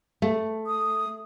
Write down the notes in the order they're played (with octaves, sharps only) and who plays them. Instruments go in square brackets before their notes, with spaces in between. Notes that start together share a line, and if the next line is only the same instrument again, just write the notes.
[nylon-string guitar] A3
[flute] D#6